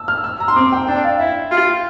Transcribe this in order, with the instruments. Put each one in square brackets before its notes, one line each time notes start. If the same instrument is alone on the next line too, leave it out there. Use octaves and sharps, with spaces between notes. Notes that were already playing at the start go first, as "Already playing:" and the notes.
Already playing: [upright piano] A5 E6
F6
E6
A#5
C6
[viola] C4 [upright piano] D6
[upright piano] G5
[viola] D4 [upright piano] G5
[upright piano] F5
[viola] E4 [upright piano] E5
[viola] F4